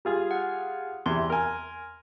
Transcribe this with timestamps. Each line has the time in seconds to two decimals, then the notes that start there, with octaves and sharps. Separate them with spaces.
0.05 G3 F4 G#4
0.31 F#5
1.06 E2 C3 C6
1.30 A#4 G#5